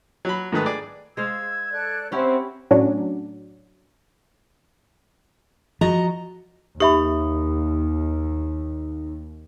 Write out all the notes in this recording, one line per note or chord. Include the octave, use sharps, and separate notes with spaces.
F#3 B5
G#2 D#3 A3 B4 D#6
G#4 D5
G#3 C5 F5 E6 G#6
A4 D5 F#6
C4 C#4 E4 G4 E5 F#5
A2 F#3 C#4 D4
F3 F#4 D#5 A#5
D#2 D#4 G4 E5 B5